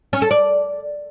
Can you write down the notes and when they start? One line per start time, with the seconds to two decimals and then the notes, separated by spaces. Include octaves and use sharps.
0.13 C#4
0.22 A4
0.31 D5